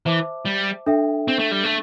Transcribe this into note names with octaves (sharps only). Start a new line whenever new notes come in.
E3 C5 E5 A5 D6
G3
D4 A4 E5 G5
C4
A3
G3
A3